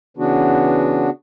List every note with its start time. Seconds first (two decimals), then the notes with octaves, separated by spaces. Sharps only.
0.17 C#3 E3 B3 D4 F#4